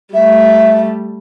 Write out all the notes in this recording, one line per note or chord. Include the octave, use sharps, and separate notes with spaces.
G3 A3 E5